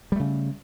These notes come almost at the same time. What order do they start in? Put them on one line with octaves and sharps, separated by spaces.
G3 A3 C#3